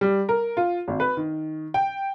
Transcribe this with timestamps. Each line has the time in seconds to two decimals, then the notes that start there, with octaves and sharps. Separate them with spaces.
0.01 G3
0.29 A#4
0.57 F4
0.88 G#1
1.00 B4
1.17 D#3
1.74 G5